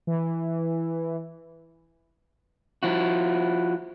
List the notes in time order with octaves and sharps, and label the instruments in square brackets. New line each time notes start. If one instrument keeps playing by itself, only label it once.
[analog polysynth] E3
[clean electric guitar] F3 E4 F#4